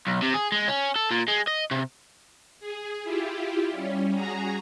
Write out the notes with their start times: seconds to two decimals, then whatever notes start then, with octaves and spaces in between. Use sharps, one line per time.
0.07 B1
0.22 C3
0.34 G#4
0.52 G#3
0.68 C#4
0.96 A4
1.11 A#2
1.28 G#3
1.48 D#5
1.71 C3
2.60 G#4
3.03 E4 F4 G4
3.71 G3 C#4
4.14 F#4 G#4 A#5